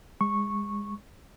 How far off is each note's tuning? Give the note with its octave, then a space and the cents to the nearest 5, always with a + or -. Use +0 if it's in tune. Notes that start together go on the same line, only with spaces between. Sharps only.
G#3 -25 C#6 -10